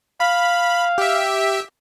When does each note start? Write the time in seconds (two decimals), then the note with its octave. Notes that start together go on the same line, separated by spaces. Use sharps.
0.20 F5 B5
0.98 G4 E5